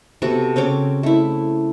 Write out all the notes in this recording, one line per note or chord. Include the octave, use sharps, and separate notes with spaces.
C3 B3 F#4 A4
C#3 C4 C#5 D6
A3 E4